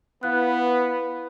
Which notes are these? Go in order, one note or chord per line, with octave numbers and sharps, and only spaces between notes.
B3 E4 B4 F5 F#6